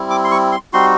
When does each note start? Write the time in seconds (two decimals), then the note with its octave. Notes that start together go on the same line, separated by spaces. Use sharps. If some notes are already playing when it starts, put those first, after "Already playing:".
Already playing: G3 C4 E4
0.10 D6
0.24 C6
0.31 C#6
0.52 C6
0.73 G3 C4 D#4 F#4 C6